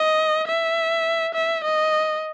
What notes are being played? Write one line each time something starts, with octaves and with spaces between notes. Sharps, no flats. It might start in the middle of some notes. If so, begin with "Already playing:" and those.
Already playing: D#5
E5
E5
D#5